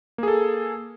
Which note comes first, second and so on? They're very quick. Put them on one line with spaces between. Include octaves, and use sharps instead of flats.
A#3 G#4 A4